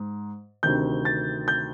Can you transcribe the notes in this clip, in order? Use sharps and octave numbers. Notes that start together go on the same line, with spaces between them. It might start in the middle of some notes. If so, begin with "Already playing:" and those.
Already playing: G#2
D2 C3 D#3 G6
A6
G6